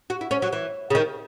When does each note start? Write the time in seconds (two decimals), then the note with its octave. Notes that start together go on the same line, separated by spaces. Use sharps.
0.10 F#4
0.21 E4
0.31 C#4
0.42 F#3
0.53 E3
0.90 C#3
0.95 D#3